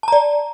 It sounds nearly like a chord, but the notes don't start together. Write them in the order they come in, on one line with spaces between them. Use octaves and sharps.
A5 A#5 D5